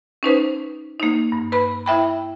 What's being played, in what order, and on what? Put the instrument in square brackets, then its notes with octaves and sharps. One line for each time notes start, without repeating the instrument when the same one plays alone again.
[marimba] C#4 D#4 B4 C5
A#3 D#4
G2
B4 B5
E4 E5 G5 B5